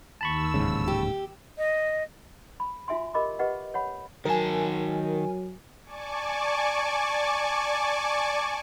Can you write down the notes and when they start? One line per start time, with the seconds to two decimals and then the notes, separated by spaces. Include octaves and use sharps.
0.21 D#2 A5 B5 C#6 E6
0.54 D1 G#2 C#3
0.88 G4
1.58 D#5
2.60 B5
2.88 F4 F#4 E5 G#5 C6
3.14 G4 A#4 D#5 B5 D6
3.39 G4 B4 D#5 F#5
3.74 C#5 F#5 B5
4.25 D#3 F#3 A#4 G#5 A5
5.84 D5 G#5 A5 C#6 D6